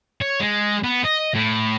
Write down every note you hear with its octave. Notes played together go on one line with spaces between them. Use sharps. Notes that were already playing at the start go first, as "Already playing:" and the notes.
C#5
G#3
B3
D#5
A2